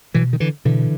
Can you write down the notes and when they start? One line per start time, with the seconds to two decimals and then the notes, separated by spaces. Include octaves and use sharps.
0.14 B2 E3 F#3
0.33 D#3
0.40 D3 E3
0.65 B2 D3 E3